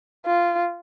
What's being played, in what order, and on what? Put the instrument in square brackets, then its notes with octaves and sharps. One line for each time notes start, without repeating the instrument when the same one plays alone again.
[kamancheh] F4